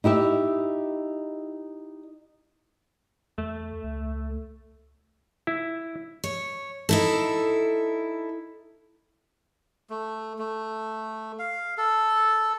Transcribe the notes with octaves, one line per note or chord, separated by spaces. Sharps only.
D#4 E4 G4 E5
E2 A3
C#2
E4
C#5
D#4 E4 A4
A3
A3
F5
A4